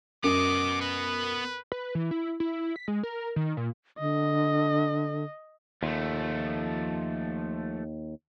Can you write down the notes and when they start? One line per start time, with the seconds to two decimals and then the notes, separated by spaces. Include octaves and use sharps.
0.24 F#2 B3 D#5 D6
0.81 B4
1.72 B4
1.95 E3
2.11 E4
2.40 E4
2.76 B6
2.88 G#3
3.03 A#4
3.36 D#3
3.57 A#2
3.99 D3 D#5
5.83 D#2 F3 A3